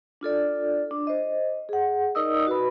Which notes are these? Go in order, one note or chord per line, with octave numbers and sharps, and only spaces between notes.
D4 F4 A4 D5
D4
C5 D#5
G#4 F#5
D#4 A#4 D5 D#5 D#6 E6
F#4 B4 B5